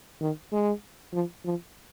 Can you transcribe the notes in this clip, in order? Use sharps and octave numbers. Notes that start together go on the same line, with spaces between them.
D#3
G#3
F3
F3